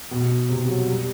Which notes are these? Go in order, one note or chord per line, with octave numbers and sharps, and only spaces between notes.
B2
C3
F#3
G3